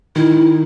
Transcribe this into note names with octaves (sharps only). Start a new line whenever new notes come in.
D#3 E4